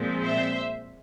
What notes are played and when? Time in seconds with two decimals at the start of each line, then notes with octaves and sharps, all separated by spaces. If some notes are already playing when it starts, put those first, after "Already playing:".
Already playing: A#2 F3 G#3 C4
0.23 C5 E5